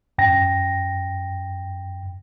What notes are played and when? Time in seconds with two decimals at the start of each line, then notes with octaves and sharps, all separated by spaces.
0.18 F#2 G5 A#6